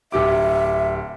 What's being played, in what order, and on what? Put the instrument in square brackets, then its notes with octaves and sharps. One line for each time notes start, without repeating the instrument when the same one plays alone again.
[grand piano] D1 G4 D6 [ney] E5